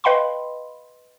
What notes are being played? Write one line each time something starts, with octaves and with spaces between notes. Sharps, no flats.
B4 D#5 F5 G5 B5 C6